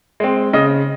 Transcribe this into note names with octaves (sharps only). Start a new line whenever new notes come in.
G#3 C4
C#3 D#5